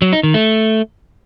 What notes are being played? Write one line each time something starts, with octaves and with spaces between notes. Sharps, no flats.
F#3
D#4
D#3
A3